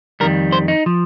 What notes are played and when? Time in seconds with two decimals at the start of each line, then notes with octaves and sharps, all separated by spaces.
0.20 F2 D#3 G3 A#4
0.52 C5
0.68 D#4
0.86 F3